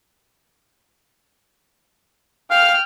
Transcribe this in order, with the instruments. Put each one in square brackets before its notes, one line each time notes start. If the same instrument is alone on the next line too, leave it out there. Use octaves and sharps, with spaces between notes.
[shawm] F5 [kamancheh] G5 F6